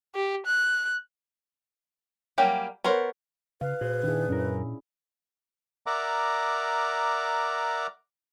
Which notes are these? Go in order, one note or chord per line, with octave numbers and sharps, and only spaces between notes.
G4
F#6
F#3 G3 A#3 C#4 G4
B3 A#4 C5 C#5
C#3 B4 F5
A#2 F#4 G#4 C5
D#3 D4 E4 G#4
F#2 C#4 E4 A#4
A#4 D5 E5 F#5 A#5 D6